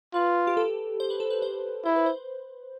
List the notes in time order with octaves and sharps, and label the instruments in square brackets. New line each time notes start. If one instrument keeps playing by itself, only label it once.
[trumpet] F4 [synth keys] B4
[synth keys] G4
A4
C5
B4
A4
B4
C5
[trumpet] E4 [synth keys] C5
[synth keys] B4
C5